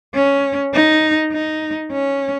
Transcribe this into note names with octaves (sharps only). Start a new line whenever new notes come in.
C#4
D#4
D#4
C#4